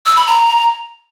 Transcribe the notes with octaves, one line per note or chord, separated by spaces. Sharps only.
E6
B5
A#5